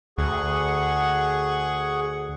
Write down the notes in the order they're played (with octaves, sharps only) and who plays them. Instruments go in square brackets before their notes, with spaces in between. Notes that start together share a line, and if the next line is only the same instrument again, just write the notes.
[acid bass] D2 [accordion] G#4 F#5 C#6